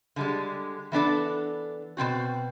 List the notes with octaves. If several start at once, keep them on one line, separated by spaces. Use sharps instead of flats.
D3 G3 G#3
E3 B3 D4 A4
B2 E3 C4 F#4